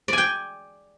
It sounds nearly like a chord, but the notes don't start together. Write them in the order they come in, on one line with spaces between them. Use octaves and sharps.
D5 G#5 G5